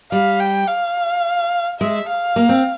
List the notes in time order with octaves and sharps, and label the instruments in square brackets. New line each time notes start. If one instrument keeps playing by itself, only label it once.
[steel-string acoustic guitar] G3 [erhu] F5
[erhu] G5
F5
[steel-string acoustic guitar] G#3 [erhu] E5
[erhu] F5
[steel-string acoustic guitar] A#3
C4